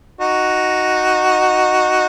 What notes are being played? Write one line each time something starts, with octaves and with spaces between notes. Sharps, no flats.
D#4 F#4